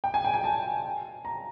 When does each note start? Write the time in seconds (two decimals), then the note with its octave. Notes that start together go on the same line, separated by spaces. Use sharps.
0.04 G5
0.14 G#5
0.24 G5
0.34 G#5
0.44 A5
1.25 A#5